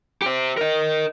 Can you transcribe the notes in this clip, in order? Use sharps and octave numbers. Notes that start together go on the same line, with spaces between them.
G4 C5
A#4 D#5